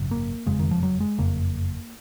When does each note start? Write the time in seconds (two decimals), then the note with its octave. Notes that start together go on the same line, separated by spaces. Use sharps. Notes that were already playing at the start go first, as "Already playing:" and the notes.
Already playing: G#1 F#2 C#3
0.11 A#3
0.46 F#1 F2 C#3 G#3
0.59 D#3
0.71 F3
0.83 F#3
1.00 G#3
1.18 F#1 F2 C#3 A#3